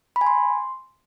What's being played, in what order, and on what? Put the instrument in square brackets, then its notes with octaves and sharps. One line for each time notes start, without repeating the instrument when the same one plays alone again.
[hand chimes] B5
G#5
C6